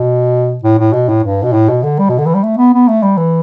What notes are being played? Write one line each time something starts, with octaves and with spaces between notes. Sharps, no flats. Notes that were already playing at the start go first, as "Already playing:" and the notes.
Already playing: B2
A2
A2
B2
A2
G2
B2
A2
B2
D3
G3
B2
D3
E3
G3
A3
B3
B3
A3
G3
E3